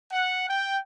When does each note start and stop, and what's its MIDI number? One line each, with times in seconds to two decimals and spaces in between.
0.12 0.47 78
0.49 0.78 79